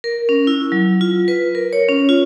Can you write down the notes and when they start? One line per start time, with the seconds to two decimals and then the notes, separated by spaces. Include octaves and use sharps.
0.04 A#4
0.29 C#4
0.47 E4
0.72 F#3
1.01 F4
1.28 B4
1.55 A#4
1.73 C#5
1.88 C#4
2.09 F4